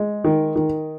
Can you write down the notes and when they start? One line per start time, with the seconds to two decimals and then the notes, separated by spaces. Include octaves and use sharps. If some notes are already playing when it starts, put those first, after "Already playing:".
Already playing: G#3
0.24 D#3
0.56 D#3